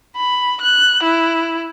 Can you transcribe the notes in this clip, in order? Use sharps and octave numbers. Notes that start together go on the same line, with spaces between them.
B5
F#6
E4